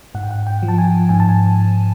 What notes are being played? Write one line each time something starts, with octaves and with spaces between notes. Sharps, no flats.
G#2 F#5
G5
F#5
G5
F3
A5
G#5
G#2 G#5
A5
G#5